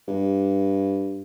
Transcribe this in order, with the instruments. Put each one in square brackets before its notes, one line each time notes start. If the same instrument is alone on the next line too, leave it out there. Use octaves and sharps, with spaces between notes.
[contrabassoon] G2